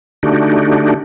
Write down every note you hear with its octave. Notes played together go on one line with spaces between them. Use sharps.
D3 A3 D4 D#4 F#4 G4